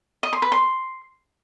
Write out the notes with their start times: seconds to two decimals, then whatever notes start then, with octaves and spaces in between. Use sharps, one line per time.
0.23 D#5
0.33 C6
0.42 B4
0.52 C6